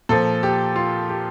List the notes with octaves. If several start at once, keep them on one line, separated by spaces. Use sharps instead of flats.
A#2 F3 A4
G4
F4
G4